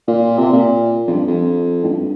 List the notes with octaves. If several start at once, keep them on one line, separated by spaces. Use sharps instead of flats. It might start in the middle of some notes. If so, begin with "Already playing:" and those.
A#2
C3
A#2
F2
G2
F2
A2
G2